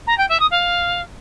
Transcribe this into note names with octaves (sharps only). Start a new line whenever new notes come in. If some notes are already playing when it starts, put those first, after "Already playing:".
A#5
G5
E5
D#6
F5